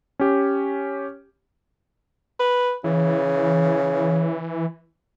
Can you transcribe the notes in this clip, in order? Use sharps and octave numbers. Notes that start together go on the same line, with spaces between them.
C#4 G4
B4
C#3 E3